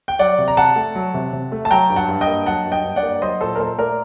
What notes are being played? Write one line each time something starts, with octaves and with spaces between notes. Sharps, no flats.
G5
F#3 D5 F#5
C3
A#5
C3 F#5 A5
A3
F#3
C3
C3
A3
A5
F#3 G5 A#5
G2
F#5 A5
G2
D#5 G5
A#3
F#3 F#5 A5
G2
D#5 G5
G2
D5 F#5
A#3
F#3 C5 D#5
A#2 A4 C5
A#4
A#2 A4 C5
A3 A#4 D5